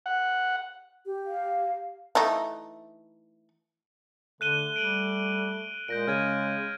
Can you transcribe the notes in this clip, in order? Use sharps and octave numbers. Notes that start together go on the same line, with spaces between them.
F#5
G4
F5
E3 A3 D#4
D3 A3 F#6 D#7 G7
G3 D7 F#7
A#2 G#3 G6 A#6 D7
C#3 F6 G#6 D#7